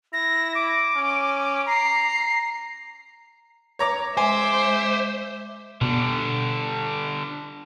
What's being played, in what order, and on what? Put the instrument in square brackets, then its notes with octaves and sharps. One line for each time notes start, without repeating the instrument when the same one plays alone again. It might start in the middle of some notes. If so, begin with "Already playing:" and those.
[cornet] E4 [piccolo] A#6
[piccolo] D6
[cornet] C#4
[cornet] A#5 [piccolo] C7
[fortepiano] C#5 A#5 D6
[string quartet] G#3 E5 [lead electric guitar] C5 [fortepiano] G#5 [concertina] D6
[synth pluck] B2 [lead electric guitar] D3 G3